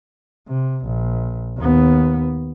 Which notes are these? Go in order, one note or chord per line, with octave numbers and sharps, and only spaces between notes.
C3
A#1
D#2 B3